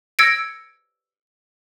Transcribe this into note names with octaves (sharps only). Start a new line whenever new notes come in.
E6 G#6 A#6 C#7 D7